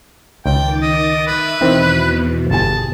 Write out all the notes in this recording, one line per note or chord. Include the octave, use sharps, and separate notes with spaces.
C#2 D#3 G5 D6 A6
D#5
B4 E5
E2 B2 D#3 E3 C4
G1 G#4 G#5 A5